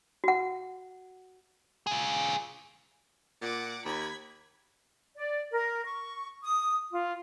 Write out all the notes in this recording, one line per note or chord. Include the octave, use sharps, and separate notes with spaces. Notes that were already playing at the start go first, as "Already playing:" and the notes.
F#4 F#5
F4 G#4
A#2 F#5 D6
D#2 B5 G#6
D5
A#4
C#6
D#6
F4